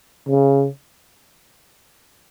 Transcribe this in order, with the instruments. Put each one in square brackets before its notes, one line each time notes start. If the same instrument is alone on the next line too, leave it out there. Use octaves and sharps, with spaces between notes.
[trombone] C#3